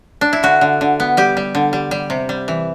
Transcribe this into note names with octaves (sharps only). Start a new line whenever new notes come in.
D4
E4
D3 F#4
D3
D3
B3
G3 G4
G3
D3
G3
G3
C3
G3
E3